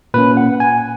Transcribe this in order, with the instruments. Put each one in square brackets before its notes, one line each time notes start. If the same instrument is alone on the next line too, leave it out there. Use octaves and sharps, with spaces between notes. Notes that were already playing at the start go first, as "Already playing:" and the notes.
[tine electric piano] A#2 A#3 C#4 B4
F#5
G#5